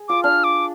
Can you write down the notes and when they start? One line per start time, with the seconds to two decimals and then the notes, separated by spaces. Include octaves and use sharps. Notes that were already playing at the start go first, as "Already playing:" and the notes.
Already playing: G#4
0.09 F4 D6
0.23 D4 F6
0.44 D6